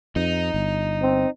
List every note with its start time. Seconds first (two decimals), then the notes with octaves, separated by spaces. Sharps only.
0.16 F2 D#4
0.54 G1
1.02 C4